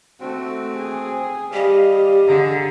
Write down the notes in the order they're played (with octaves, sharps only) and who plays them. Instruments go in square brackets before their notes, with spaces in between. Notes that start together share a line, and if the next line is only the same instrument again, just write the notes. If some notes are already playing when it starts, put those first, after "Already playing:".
[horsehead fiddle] A3 F#4 [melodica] C4
[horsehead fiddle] G#4
[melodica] G3 [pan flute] G4 [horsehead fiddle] D#5 F5
[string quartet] D3 [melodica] G#4 A#5